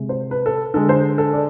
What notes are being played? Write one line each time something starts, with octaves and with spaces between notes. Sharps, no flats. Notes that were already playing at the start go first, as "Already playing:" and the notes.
Already playing: C3 G#3
C5
B4
A4
D3 G#3 A4
C5
A4
D5